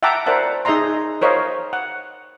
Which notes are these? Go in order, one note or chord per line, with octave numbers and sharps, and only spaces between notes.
E5 F#5 G5 A5 A#5 D6
A#4 C5 D5 E5 F#5 A5
D#4 G#4 D#5 E5 A#5 C6
A#4 C5 C#5 D#5 F5
F#5